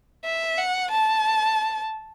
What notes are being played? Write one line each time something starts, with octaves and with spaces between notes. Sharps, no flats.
E5
F#5
A5